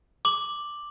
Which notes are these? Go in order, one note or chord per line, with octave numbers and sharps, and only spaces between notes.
D6 F#7